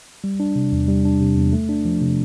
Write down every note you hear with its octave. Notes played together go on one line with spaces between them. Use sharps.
G3
D4
C3
E2
G3
D4
C3
E2
A3
D4
F3
C3